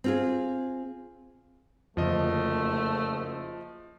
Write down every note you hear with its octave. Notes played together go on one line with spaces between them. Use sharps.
C4 F4 G#4
F#1 F2 D3 F3 A3 D#5